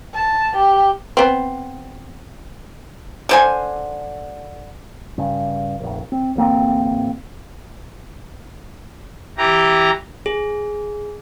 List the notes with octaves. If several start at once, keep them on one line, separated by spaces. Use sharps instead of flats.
A5
G4
B3 C4
D3 C5 G#5
G2 C#3
F1 A#1
C4
D1 A1 A#3 C4
E3 G4 A#5
G#4